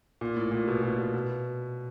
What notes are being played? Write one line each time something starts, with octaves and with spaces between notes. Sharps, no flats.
A#2
A2
A#2
B2
A#2
B2
B2